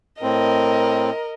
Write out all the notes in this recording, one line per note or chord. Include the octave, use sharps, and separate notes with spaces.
A2 C4 A#4 D#5